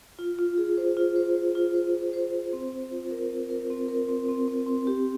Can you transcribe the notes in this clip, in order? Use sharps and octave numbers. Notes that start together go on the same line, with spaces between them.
F4
F4
G#4
C5
F4
C5
C5
F4
C5
F4
C5
C5
C4
C4
F4
A#4
C4
A#4
C4
A#4
C4
C4
C4
C4
G4